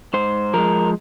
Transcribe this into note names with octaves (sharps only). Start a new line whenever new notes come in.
G#2 C5
F3 G#3 A#4